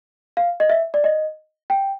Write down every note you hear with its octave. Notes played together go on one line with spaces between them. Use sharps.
F5
D#5
E5
D5
D#5
G5